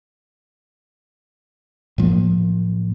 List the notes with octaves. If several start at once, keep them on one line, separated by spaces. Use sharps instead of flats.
A2 F3 F#3 A#3